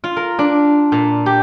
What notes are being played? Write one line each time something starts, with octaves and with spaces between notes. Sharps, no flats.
F4
A#4
D4
A#2
G4